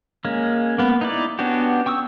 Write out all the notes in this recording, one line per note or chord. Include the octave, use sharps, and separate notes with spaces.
G#3 A#3 C#4
A#3 B3
D#4 E4 D5
B3 C#4 D4 F#4 G4
G5 C#6 D#6 E6